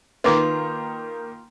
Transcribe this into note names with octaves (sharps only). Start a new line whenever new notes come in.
D#3 A#3 F4 B4 D6